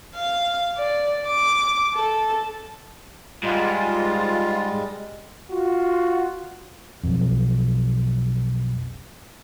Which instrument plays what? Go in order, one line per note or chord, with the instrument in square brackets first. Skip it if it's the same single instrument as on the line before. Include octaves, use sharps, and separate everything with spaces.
[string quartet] F5
D5
D6
A4
[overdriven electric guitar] G#2 [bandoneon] G3 G#3 [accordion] F4
[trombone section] F4 F#4
[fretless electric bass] B1 F2